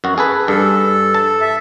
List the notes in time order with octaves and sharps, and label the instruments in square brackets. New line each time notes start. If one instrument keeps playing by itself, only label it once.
[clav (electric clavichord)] F#2 F#4
G#4 A4 B4
[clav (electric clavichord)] G2 [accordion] A4
[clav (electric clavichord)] A5
[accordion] E5